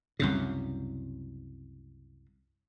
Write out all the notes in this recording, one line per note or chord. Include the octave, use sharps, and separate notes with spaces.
C2 F#2 C#3